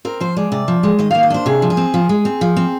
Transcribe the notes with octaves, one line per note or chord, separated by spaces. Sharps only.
C4 A#4
F3 C5
G#3 D5
C3 D5
F3
G#3
D#3 D#5
A#3 F5
D#5
D4 C5
C3 G#4
F3
G#4
C4
F3
G#3
C4
F3
C4